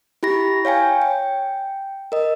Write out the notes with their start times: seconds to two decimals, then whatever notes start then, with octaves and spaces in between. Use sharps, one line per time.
0.23 E4 G4 B5 A#6
0.65 C#5 F5 G5 G#5
1.02 G5
2.12 A#4 D#5